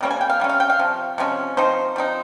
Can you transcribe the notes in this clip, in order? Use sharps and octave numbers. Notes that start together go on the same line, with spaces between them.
C3 G3 A#3 C#4
G#5
G5
F5
C3 G3 C#4
F5
G5
F5
C3 F3
C3 F3 G#3 C#4
F3 C4 D#4 C5
F3 C4 D#4